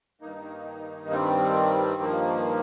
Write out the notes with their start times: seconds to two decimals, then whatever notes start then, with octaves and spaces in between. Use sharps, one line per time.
0.21 G2 D#3 A#3 D#4
1.11 G3 C4
2.02 F3 A#3